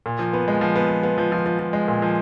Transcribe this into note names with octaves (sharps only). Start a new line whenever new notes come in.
A#2
F3
B3
G#3
F3
B3
F3
B3
F3
F3
F3
F3
G#3
A#2
F3